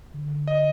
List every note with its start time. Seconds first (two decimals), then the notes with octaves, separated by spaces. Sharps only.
0.14 D3
0.48 D#5